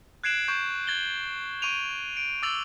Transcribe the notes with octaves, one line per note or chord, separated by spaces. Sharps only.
F#6 G#6 C7 D7 E7 F#7
C#6 G6 E7
G#6 A6 F#7 G7
C#6 D7 D#7 F7
D7
D6 E6 A6 F7 F#7